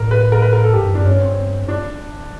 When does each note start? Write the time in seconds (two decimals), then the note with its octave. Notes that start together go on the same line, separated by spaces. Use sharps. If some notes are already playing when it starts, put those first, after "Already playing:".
Already playing: A2 A#4
0.11 B4
0.32 A#4
0.42 B4
0.53 A#4
0.64 A4
0.73 G#2 G4
0.84 G2
0.95 F#2 D4
1.05 G2 C#4
1.21 C4
1.68 D4